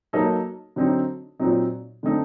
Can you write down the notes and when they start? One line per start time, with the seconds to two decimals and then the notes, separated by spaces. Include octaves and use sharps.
0.13 F#3 A#3 D#4 A4
0.76 D3 F#3 C4 D#4
1.40 A#2 F#3 C4 D#4
2.03 D3 A3 C4 D#4 A4